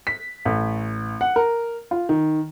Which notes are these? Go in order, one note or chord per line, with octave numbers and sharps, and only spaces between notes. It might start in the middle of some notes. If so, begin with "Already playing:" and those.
B6
A1
F#5
A#4
F4
D#3